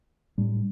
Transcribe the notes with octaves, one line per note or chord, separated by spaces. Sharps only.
A2 G3 D4